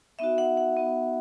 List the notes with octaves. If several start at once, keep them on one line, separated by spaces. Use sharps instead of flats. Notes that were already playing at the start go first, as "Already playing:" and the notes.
B3 D#4 F#4 E5
F#5
F#5
B3 D#4 F#4